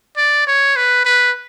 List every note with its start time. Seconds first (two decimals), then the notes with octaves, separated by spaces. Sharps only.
0.17 D5
0.47 C#5
0.76 B4
1.05 B4